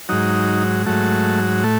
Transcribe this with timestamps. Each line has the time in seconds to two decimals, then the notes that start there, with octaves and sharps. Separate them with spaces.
0.09 G#2 F#3 D#4
0.86 G#2 F#3 A3
1.64 A2 A3